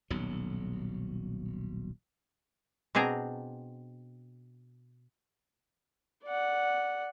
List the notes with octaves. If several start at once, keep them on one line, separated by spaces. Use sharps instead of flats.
D#1 B1 F#3
B2 C4 D4 G#4 A#5
D5 F#5